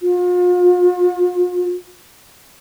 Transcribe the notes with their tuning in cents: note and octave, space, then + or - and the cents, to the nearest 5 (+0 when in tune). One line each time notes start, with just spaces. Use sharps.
F4 +40